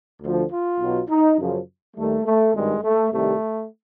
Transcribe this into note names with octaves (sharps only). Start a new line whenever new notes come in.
D2 D3 F3
F4
B1 B2 F#3
D#4
F#2 C#3 F3
D#2 D#3 G3 A3
A3
G#1 G2 D#3 G3 G#3
A3
C2 C3 D#3 G3 A3